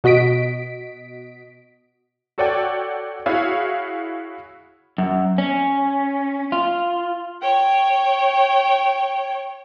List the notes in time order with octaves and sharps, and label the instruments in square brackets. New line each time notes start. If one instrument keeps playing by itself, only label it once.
[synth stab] B2 F#4 D#5 B6 D7
[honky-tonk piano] F#4 A4 C#5 D5 F#5 G5
E4 F#4 G#4 C#5 F5
[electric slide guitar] F#2
C#4
F4
[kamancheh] C#5 G5